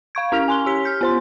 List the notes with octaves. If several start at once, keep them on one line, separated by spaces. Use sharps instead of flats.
F5 C#6 G#6
C#4 E4 F6 F7
G#5 C6 G7
G4 B6
F6 G6
B3 C5 C6